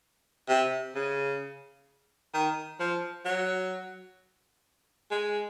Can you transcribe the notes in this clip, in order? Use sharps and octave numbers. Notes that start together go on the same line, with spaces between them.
C3
C#3
D#3
F3
F#3
G#3